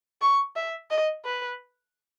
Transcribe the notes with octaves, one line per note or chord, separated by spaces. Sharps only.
C#6
E5
D#5
B4